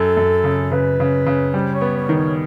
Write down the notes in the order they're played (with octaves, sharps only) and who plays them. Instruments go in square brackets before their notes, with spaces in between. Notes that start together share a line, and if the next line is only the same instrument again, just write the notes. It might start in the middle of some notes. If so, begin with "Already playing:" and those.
Already playing: [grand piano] F#2 [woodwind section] A4
[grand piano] F#2
C#3
[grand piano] C#3 [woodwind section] B4
[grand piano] C#3
C#3
[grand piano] G3 [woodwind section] C5
[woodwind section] C#5
[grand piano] B3
[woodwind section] C#5
[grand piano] D#3
[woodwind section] C#5